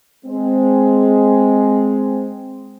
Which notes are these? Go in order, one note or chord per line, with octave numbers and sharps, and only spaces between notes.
G#3 C4